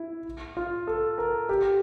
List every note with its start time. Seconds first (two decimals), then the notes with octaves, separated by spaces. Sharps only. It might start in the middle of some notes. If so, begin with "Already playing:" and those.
Already playing: E4
0.57 F4
0.87 A4
1.18 A#4
1.49 G4